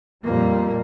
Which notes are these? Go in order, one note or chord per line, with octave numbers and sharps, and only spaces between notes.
F2 A#2 G3 A#3